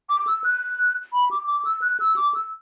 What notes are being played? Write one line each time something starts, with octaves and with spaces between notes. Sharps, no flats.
D6
E6
F#6
B5
D6
D6
E6
F#6
E6
D6
E6